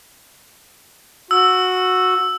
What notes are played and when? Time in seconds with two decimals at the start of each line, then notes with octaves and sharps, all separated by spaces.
1.31 F#4 E6